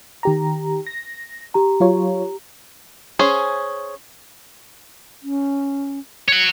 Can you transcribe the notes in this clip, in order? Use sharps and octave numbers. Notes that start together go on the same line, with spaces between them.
D#3 G4 A#5
A#6
G4 A#5
F#3 F4 C#5
C#4 G#4 C5
C#4
C#5 F#5